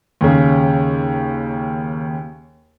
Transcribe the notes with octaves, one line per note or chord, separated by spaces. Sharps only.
D#2 C#3